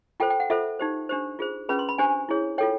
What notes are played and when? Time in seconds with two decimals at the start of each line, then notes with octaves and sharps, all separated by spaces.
0.20 F4 A4 C5 G5
0.30 G5
0.40 F#5
0.50 F4 A4 C5 E5
0.79 D#4 G4 C5
1.09 D4 G4 C5
1.39 F4 G#4 C5
1.69 C#4 F4 G#4 B4 B5
1.79 C6
1.89 B5
1.98 D4 G4 C5 G#5
2.29 E4 G#4 C#5
2.58 F4 A4 C#5 G5